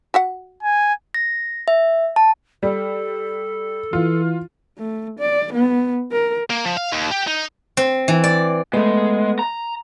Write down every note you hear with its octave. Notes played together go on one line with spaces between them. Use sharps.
F#4 E5 F#5
G#5
A#6
E5
A5
G3 A4
E3 F4
A3
D5
B3
A#4
A#3
F3
F5
D#2
G4
D#4
C4
E3
D5
G#3 A3 B3
A#5